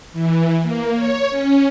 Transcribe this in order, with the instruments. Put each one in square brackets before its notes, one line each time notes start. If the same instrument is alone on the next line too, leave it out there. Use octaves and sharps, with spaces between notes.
[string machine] E3
A#3
C#5
C#4